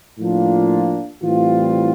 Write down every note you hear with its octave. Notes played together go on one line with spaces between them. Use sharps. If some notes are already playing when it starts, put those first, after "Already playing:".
A2 F3 A#3 D4 F4
A2 E3 G3 C4 F4